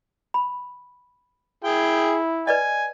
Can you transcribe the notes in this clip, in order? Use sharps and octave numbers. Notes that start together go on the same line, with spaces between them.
B5
E4 G#4 G5
B4 D5 D#5 G#5